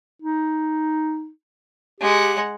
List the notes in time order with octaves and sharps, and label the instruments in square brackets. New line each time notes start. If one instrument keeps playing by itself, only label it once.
[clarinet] D#4
[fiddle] G#3 F#5 [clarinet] G4